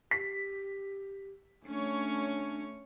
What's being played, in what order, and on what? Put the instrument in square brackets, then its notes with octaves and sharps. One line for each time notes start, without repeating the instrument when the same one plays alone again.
[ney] G4 [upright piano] B6
[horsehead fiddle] A3 [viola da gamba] C#4 C#5 [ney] D4